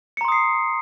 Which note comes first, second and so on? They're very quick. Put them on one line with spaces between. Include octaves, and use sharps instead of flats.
C#7 A#5 C6 D#6 C7